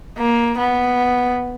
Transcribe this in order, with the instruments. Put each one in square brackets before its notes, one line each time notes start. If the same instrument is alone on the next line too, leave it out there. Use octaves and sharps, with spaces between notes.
[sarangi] A#3
B3